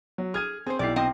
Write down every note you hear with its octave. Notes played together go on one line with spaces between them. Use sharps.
F#3
G#4 F6 G#6 D#7
C4 G#4 C5
B1 E4 G4 D5 C7
C3 C4 D#5